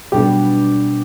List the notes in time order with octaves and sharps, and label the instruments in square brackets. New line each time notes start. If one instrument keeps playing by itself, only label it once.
[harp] B2 G3 B3 D4 [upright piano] G4